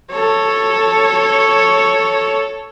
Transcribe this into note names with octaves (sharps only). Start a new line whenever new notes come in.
A4 C#5